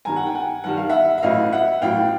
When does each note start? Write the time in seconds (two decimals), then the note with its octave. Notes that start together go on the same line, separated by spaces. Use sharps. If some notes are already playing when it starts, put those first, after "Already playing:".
0.05 G2 D#3 G3 G#5 A#5
0.16 F#5
0.26 G5
0.35 F#5 G#5
0.64 G2 D#3 G3 F#5
0.77 F5
0.90 E5 F#5
1.18 E5
1.22 A1 A2 F#3 D#5 F5
1.52 E5 F#5
1.82 A1 A2 F#3 F5 G5